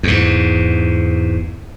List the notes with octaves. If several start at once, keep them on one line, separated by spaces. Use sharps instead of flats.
E2 G#2